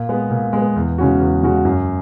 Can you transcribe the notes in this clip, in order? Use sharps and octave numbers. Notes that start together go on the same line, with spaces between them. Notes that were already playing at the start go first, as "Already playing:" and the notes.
Already playing: A#2
G#3 B3
A#2
G#3 B3
E2
C#3 G#3 C#4 F#4
E2
C#3 G#3 C#4 F#4
F#2